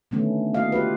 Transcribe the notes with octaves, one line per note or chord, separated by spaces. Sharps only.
B2 D3 D#3 A3 B3 C#4
A#3 E4 F#4 D#5 F5
F4 G4 B4